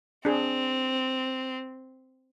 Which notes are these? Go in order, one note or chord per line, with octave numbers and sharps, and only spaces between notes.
C4 D4 G#4